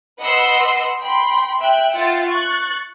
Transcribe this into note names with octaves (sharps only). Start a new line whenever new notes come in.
B4 D#5 F#5 B5 C6 E6
G5 B5 C6
E5 G5 F#6
F4 E5 F#5 G5 A6
C#6 F#6 A6